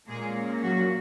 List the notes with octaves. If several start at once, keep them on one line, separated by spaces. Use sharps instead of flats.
A#2 G#3 A#3 C#4 G#4
F#3 F#4